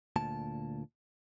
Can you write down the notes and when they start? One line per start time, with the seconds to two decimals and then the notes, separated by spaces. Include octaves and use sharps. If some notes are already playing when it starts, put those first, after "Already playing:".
0.16 D2 A#2 A5